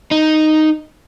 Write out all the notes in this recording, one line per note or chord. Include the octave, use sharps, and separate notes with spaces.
D#4